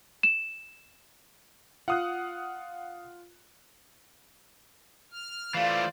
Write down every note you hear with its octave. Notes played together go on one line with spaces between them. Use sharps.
E7
F4 F5 F#5 D#6 F#6
F6
E3 A3 F4 C5 D5 F5